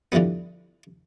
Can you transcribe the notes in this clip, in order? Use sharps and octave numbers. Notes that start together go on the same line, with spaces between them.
D3 E3 F3 G3 B3